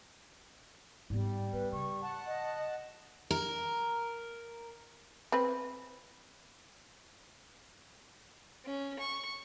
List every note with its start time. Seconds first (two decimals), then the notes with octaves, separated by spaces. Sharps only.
1.10 G#2 G3 B3
1.53 B3 B4
1.72 C#3 C#6
2.03 F#5 A5
2.27 D#5
3.31 A#4
5.32 C4 B4
8.65 C#4
8.99 C#6